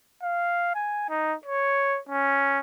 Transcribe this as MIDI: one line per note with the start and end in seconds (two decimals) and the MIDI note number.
0.23 0.74 77
0.75 1.05 80
1.09 1.35 63
1.46 1.99 73
2.09 2.59 61